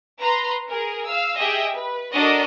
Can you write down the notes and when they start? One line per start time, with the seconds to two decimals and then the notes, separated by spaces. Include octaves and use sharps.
0.18 B4 A#5 C6
0.67 G#4 A#4
1.06 F5 E6
1.37 G4 G#4 D#5 E5 G5
1.73 B4
2.13 D4 F#4 A4 A#4 D5 D#5